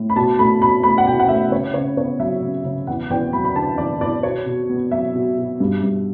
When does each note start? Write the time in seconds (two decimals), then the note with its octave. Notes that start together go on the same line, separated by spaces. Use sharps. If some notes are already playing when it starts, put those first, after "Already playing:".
Already playing: A2
0.09 B5
0.16 B2 A5
0.39 A3 B5
0.60 B2 B5
0.83 A3 B5
0.98 F#5
1.06 B2 G5
1.19 F#5
1.28 A3 E5
1.51 C#3 C#5
1.74 C#3 C#5
1.97 B3 C#5
2.19 F#3 E5
2.42 C#3
2.65 C#3
2.87 E2 F#5
3.10 E2 G5
3.33 F#3 B5
3.45 B5
3.55 D3 A5
3.78 E2 D5
4.01 E2 D5
4.23 B2 C#5
4.46 B2
4.69 B3
4.91 F#3 E5
5.14 B2
5.38 B2
5.60 G2
5.83 G2